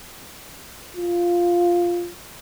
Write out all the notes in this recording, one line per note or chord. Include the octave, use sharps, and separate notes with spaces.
F4